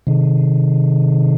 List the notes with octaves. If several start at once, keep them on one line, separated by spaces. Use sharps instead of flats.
C3 D#3